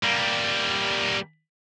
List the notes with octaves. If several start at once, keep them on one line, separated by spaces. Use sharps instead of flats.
G3 A#3